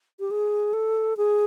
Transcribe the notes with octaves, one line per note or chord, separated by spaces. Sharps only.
G4
G#4
A4
G#4